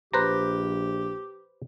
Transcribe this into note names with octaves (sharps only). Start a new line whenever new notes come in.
A#1 G4 B4 C5 A#5